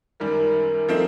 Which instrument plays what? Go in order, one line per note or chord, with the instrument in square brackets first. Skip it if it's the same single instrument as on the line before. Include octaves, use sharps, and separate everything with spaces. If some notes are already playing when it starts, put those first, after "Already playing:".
[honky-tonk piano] F#2 D#3 G3 [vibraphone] A#4
[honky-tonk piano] F3 A3 C4 D#4